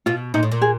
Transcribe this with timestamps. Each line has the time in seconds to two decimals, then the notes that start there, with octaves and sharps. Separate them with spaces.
0.06 B2 F4
0.34 A#2 D#4
0.43 A2
0.52 A#2
0.62 G#4